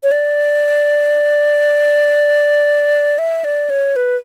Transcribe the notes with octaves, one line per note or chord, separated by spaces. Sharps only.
C#5
D5
E5
D5
C#5
B4